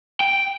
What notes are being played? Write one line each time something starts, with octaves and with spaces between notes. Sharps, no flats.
G5